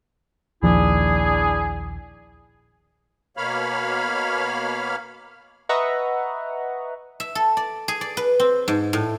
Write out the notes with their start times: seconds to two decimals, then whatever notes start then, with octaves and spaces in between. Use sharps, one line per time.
0.63 A#1 D#2 F3 D4 E4 G#4
3.37 B2 A#3 C#5 F5 B5 F6
5.69 B4 D#5 E5 F#5 A#5 C#6
7.20 E5
7.35 A4
7.57 D5
7.88 G#4
8.01 D5
8.17 B4
8.40 C4
8.68 G#2
8.93 A2